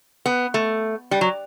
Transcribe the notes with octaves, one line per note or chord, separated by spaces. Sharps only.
B3
A3
G3
F#3